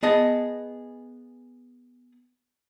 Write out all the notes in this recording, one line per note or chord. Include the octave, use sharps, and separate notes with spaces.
B3 G#4 D#5 A5